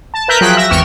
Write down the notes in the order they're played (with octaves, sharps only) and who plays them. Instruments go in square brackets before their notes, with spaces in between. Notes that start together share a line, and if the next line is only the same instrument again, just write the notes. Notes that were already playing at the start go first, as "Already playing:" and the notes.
[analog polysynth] A5
A#4 B4 E5 A#5 F#6 G6
F3 F#3 G#4 G5 F#6 B6
E5 E6 A#6
G#1 E2 G5 C#6 F6 E7